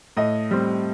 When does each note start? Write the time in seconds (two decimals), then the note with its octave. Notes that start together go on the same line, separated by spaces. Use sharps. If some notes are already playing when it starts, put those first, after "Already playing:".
0.17 A2 D#5
0.51 G3 C4